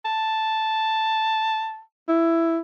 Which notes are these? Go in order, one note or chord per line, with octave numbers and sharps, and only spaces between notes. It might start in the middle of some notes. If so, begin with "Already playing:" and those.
A5
E4